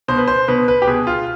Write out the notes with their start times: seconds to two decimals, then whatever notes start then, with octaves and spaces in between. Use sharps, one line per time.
0.08 B2 C5
0.18 B4
0.27 C5
0.48 B2 B4
0.68 B4
0.82 G4
0.87 B2 G#4
1.07 F4